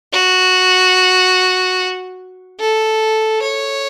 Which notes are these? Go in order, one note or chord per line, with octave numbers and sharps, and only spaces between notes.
F#4
A4
C#5